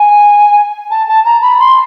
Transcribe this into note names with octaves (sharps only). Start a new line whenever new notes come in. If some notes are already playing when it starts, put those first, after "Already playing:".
Already playing: G#5
A5
A5
A#5
B5
C6